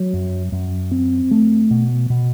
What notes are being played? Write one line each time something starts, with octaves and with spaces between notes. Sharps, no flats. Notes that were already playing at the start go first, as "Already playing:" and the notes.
Already playing: F#3
F#2
F#2
C4
A3
B2
B2